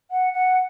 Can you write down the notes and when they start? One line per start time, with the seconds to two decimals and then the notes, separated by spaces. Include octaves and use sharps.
0.11 F#5
0.33 F#5